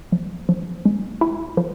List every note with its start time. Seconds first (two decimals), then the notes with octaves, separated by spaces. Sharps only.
0.12 F3
0.49 F3
0.85 G#3
1.21 E4
1.57 F3